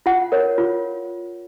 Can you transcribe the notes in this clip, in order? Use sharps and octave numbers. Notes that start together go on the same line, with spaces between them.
F4 F#5
A#4 C#5
F4